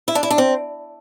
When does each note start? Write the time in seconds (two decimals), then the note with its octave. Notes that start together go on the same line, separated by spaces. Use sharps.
0.08 E4
0.15 D4
0.23 E4
0.30 D4
0.38 C4